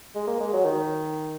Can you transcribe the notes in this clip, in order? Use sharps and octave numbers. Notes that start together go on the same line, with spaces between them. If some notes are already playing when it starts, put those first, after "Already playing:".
G#3
A#3
G#3
F#3
D#3